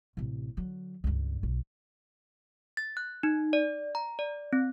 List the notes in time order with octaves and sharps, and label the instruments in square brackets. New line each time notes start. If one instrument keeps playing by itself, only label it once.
[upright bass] A1 C3
D3 F#3
C#2 G2
B1
[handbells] A6
F#6
D#4
D5
A#5
D5
C4